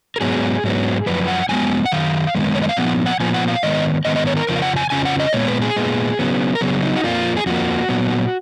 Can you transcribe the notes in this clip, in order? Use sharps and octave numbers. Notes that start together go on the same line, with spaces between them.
A#4
G#2 F#3 B3 G#4
G#2 F#3 B3
F#2 F3 B4
F#5
F#2 F3 G#3 B3 G#5
F#5
F#2 D#3 F5
F#2 D#3 G#3 B3
C#5
D#5
F5
A#2 F3 B3 F#5
F#5
A#2 F3 B3 G#5
F#5
F5
G#2 D#3 G#3 B3 D#5
G#2 D#3 G#3 B3 D#5
D#5
C#5
A#4
F2 C#3 F3 A#4
F5
F#5
G#5
F2 C#3 F3 G#5
F#5
D#5
A#2 G#3 B3 C#5
B4
G#4
A#2 G#3 B3
C#3 F#3 B3
A#4
C#3 F#3 B3 G#4
D#4
F#4
F2 F3 A#3 F4
G#4
F2 F3 A#3 F#4
A#2 F#3 B3